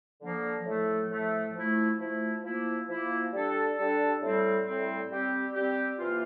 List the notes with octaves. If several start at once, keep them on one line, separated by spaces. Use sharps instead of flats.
D3 F3 A#3
A2 F3 A3
A2 F3 A3
F3 A3 E4
F3 A3 E4
F3 A#3 E4
F3 A#3 E4
G3 D4 A4
G3 D4 A4
A2 G3 C4
A2 G3 C4
G3 C4 G4
G3 C4 G4
C3 E3 A#3 F4